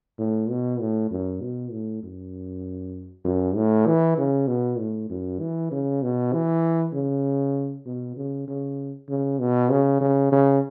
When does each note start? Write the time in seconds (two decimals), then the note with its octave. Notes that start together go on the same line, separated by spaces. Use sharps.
0.18 A2
0.50 B2
0.80 A2
1.11 F#2
1.41 B2
1.71 A2
2.03 F#2
3.25 F#2
3.56 A2
3.86 E3
4.18 C#3
4.48 B2
4.78 A2
5.10 F#2
5.40 E3
5.72 C#3
6.02 B2
6.33 E3
6.94 C#3
7.86 B2
8.17 C#3
8.48 C#3
9.09 C#3
9.39 B2
9.70 C#3
10.01 C#3
10.32 C#3